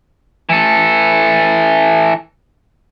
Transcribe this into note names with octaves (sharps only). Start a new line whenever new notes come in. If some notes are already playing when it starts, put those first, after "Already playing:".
E3 A4